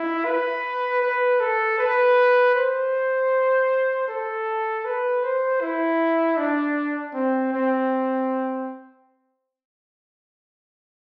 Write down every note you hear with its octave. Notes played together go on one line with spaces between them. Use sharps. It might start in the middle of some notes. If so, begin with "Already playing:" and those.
Already playing: E4
B4
B4
A4
B4
C5
A4
B4
C5
E4
D4
C4
C4